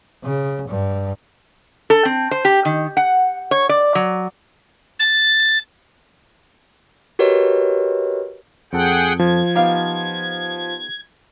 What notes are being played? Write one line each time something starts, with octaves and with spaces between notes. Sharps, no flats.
C#3
G2
A4
C4
C5
G4
D#3
F#5
C#5
D5
F#3
A6
F#4 G4 A#4 B4 C#5 D#5
F2 G#4 A4 F#5 G5
F3 G#6
B3 D#4 G4 F5